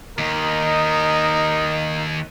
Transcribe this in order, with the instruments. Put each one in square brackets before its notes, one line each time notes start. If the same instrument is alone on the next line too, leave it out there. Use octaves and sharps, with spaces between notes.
[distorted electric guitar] D#2 [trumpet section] D#4 A#4 D#5